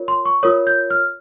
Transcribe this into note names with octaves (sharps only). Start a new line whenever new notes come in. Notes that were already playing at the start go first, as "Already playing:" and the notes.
Already playing: F4 A#4 C#5
C6
C#6
F4 A#4 C#5 D#6
G6
F6